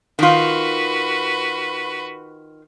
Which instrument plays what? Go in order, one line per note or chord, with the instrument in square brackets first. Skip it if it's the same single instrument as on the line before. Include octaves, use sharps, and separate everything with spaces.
[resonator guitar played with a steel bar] D#3 F4 [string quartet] F#4 B4